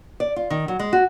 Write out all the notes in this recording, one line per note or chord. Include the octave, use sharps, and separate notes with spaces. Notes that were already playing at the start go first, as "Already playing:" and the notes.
D5
F4
D#3
F#3
G#3
F#4